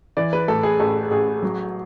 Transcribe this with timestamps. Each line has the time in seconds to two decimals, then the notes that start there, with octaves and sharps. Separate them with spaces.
0.17 E3 D5
0.33 B4
0.48 A2 A4
0.63 G#4
0.80 A1 A4
1.11 A1 G#4
1.42 F#3